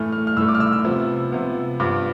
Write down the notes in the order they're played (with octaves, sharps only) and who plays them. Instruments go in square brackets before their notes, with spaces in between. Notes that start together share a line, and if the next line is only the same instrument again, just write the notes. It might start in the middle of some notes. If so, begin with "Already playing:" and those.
Already playing: [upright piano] A2 E3 A3 F6
F6
F6
A2 E3 A3 E6
D6
F6
E6
E6
C3 F3 B3
C3 F3 B3
G2 F3 B3 D6